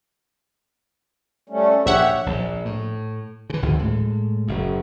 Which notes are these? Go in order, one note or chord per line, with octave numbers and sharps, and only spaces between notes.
G3 A3 C#4
A#1 G4 C#5 E5 F#5
A#1
A2
C#3 E3
G#1 D2 C#3 F3
A2 G#3
F#1 F#2